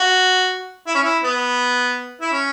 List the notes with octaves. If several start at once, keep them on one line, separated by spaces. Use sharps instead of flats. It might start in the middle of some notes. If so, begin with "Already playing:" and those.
Already playing: F#4
E4
C#4
E4
B3
E4
C#4